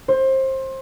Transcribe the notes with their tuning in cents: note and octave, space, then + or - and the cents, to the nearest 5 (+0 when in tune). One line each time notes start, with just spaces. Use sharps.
C5 +25